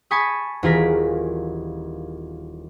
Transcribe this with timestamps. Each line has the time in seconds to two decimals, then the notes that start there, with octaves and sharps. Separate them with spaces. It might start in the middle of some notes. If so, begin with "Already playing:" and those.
0.11 G#5 A5 B5 C#6 D#6
0.63 D#1 E3 F4 G#4 A#4 B6